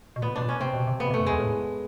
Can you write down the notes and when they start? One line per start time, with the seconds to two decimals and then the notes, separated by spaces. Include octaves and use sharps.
0.16 B2
0.22 A#2 B3
0.36 B2 D4
0.42 A#2
0.49 C#4
0.61 C3 C4
0.74 B2
0.87 C3
1.00 C#3 B3
1.06 B2
1.11 C3
1.14 A3
1.20 F#2
1.26 E2 G#3
1.40 A2